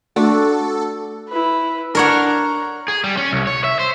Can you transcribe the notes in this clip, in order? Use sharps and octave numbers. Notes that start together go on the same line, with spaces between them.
A3 D4 F#4 A4 D5
E4 B4
D4 A#4 C#5 F#5 F6
A#5
G#4
G3
C#4
C2
C#5
E5
C5